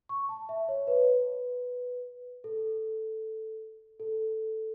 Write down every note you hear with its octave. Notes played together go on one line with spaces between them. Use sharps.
C#6
A5
E5
C#5
B4
A4
A4